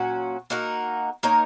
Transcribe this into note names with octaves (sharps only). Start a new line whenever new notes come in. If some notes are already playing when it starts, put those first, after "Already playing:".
Already playing: A#2 F#3 C#4 F#4
A#3 D#4 F#4 A#4
A#3 D#4 A#4 C#5